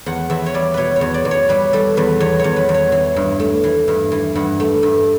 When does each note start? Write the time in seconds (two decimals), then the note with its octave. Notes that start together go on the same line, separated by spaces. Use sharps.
0.06 E2 F#5
0.30 E2 E5
0.46 C#5
0.54 G3 D5
0.74 B2 B4 C#5
0.96 C#5
1.01 E2
1.14 D5
1.25 E2
1.31 C#5
1.49 G3 B4
1.73 G3 A4
1.97 E2 B4
2.20 E2 C#5
2.39 E2 C#5
2.56 B4
2.69 E2
2.74 C#5
2.92 E3
3.16 G2
3.40 A3
3.64 E3
3.88 G2
4.12 E3
4.35 G2 F#5
4.60 A3
4.83 G2